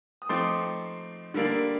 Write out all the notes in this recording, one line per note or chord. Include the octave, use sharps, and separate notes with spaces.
D#6
F3 A3 C4 D#4 C6 D6
D3 G3 A#3 D4